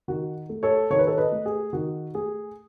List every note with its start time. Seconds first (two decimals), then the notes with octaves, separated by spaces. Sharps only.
0.08 D#3 F#4
0.49 A3
0.63 A4 C#5
0.90 D#3 C#5
0.99 B4
1.07 A4 C#5
1.18 B4 D#5
1.32 A3
1.46 G#4
1.73 D#3 F#4
2.14 A3 G#4